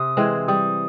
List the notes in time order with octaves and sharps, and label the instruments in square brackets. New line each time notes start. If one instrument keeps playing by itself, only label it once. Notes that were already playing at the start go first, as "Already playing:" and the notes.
Already playing: [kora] C3 [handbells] D#6
[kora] E3 G#3 C4
[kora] G3 [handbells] D#6